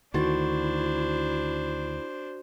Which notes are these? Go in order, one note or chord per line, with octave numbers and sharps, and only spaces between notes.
D2 D#3 D4 E4 F#4 C5 C6 A6